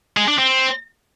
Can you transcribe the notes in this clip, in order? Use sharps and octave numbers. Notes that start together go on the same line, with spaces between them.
G#3
D4
C4